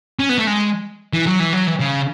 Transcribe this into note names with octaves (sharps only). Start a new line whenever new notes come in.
C#4
B3
A3
G#3
E3
F#3
E3
F#3
E3
C#3